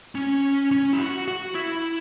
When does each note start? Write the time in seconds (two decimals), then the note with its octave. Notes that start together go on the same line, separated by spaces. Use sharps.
0.15 C#4
0.71 C#4
0.93 E4
0.99 F#4
1.28 F#4
1.55 E4